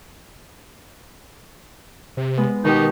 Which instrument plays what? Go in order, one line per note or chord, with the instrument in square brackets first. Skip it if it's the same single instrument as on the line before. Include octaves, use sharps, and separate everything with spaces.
[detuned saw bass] C3
[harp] G#3 B3
[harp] B2 G4 [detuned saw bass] D#3 [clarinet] D#4